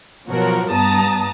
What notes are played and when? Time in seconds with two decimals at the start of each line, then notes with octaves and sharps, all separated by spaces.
0.28 B2 F3 F#3 F#4 A#4
0.71 G2 B3 A5 A#5 D#6